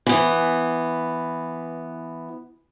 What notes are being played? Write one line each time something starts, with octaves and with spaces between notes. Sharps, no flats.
E3 B3